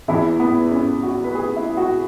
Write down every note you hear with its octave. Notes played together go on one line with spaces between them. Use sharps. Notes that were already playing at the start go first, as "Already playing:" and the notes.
E2 E3 E4
B3
C#4
F#4
B4
G#4
E4
F#4